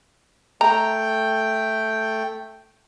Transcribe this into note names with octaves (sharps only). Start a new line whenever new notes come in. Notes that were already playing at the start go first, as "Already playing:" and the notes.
A3 G5 A#5